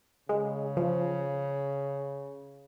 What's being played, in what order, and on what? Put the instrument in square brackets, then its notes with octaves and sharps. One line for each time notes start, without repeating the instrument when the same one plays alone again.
[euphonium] C#3 [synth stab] G#3
[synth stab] F3